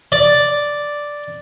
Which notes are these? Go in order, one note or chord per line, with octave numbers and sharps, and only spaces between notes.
D5